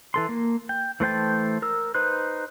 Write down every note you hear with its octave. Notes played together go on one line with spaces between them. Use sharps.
E3 A4 C6
A#3
G5
E3 A3 C5 G5 A5
A#4 E6
D#4 B4 C5 F#6